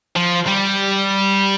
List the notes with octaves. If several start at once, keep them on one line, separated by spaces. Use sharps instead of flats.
F3
G3